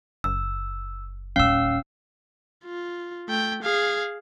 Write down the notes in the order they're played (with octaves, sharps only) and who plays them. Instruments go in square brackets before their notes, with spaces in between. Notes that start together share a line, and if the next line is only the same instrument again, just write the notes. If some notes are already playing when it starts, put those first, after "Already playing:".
[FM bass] F#1 [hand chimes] E6
[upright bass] D#1 D#4 [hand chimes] C#4 [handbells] F5 E6
[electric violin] F4
A3 G5
G#4 F5